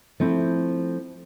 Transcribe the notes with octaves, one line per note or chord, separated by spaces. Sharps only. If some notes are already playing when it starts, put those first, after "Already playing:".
F3 A3 C4 E4